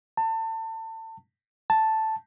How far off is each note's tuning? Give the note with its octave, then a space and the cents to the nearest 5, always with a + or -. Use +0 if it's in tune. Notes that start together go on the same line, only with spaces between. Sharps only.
A5 +30
A5 +0